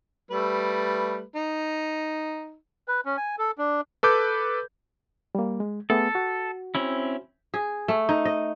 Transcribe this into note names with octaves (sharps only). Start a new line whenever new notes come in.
G3 A3 B4
D#4
B4
C#4
G#5
A4
D4
A4 B4 D6 G6
G3 A#3
G#3
A3 B3 G#4 A4
F#4
C4 C#4 E4
G#4
A3
D#4
D#5